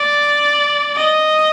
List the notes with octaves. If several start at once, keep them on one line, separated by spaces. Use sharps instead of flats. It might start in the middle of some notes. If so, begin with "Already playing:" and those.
Already playing: D5
D#5